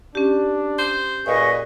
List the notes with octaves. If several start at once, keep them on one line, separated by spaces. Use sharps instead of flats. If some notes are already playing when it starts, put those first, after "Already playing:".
C#4 D4 G4
C5
A#2 G#4 B4 D#5 C#6